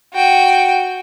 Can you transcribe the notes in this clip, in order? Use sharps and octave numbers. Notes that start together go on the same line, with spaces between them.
F#4 G5